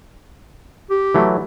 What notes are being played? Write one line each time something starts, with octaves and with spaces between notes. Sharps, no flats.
G4
E3 F#3 A3